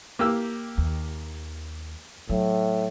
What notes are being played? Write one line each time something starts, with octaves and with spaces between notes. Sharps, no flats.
A#3 G4 E6
D#2
A2 F#3